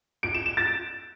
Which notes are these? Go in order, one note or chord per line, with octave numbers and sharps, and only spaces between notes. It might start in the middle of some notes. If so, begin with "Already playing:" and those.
D7
E7
E7
A6